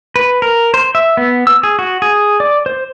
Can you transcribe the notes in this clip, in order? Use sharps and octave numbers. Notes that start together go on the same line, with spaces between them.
B4
A#4
C5
E5
B3
E6
G#4
F#4
G#4
D5
C5